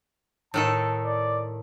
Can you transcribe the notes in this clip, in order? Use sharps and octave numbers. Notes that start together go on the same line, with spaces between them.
A2 D#3 A4 A5
D5